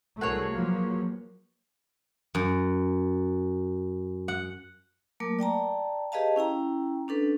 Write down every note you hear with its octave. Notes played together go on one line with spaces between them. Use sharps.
C2 A3 F#4 G#4 A#4 B4 C#5 C7
F3 F#3 A#3
F#2
F#5
F#3 A3 A#3 A#4 D6
D5 G5 A5 A#5
G4 G#4 B4 D#5 F5 A5
C#4 E4 G5 A#5
C#4 D4 A4 B4